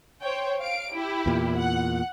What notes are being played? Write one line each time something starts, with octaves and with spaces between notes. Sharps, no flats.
C5 C#5 G5
F5 D7
E4 G4
E2 A#2
F#5